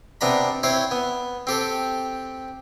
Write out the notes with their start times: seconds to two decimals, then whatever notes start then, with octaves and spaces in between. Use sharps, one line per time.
0.21 C3 B3 D4 A#5 B5
0.63 C4 E4 C5 C#5
0.91 B3
1.47 C4 G4 A4